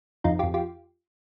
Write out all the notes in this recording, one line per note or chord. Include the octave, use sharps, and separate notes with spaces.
F2 D#4 F4
F2 F4 G4
F4 G4